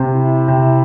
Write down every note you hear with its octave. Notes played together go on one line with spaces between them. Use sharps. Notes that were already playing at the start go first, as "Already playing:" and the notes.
Already playing: C3 C4
E4
C3 C4